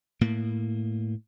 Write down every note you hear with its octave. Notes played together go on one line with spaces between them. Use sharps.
A2 A#3